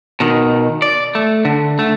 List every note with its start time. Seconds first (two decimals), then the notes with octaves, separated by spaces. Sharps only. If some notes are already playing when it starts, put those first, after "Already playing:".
0.20 B2 D#3
0.82 D5
1.15 A3
1.45 D3
1.79 A3